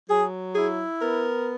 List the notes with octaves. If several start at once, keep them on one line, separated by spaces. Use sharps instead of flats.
F#3 G#4
E4 G#4
B3 A#4